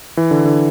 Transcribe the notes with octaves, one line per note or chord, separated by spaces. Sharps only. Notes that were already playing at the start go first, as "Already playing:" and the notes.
E3
D3
D3